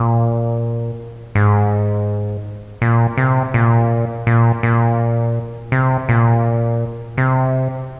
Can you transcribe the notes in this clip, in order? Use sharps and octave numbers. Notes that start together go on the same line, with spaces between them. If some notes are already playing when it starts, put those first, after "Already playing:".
Already playing: A#2
G#2
A#2
C3
A#2
A#2
A#2
C3
A#2
C3